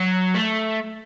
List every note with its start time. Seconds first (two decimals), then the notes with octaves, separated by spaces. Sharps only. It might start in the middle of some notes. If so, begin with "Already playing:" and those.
Already playing: F#3
0.35 A3